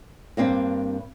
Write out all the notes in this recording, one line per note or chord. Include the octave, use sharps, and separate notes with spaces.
G2 A#3 C4 D4